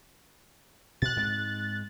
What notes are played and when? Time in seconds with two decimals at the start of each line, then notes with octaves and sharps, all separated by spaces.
1.02 B2 F#6 A6
1.16 G#2 G#3 C4